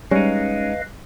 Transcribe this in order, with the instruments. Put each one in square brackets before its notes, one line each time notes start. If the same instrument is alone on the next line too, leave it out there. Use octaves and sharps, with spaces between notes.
[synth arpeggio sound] G3 [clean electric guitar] G#3 D#4 [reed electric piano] C#4 [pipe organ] B4 D#5 F5